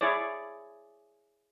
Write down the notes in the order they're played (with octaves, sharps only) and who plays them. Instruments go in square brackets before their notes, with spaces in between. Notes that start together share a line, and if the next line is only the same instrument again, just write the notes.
[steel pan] E4 G#4 C#5 D5